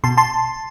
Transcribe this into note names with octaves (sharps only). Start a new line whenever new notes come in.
B2 A5 C6
A5 C6